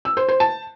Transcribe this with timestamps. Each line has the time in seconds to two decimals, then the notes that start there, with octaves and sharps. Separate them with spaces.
0.05 E6
0.17 C5
0.29 C5
0.40 A5